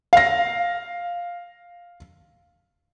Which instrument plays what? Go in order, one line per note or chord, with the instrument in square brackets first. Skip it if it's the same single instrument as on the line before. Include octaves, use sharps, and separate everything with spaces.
[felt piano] F5 A#6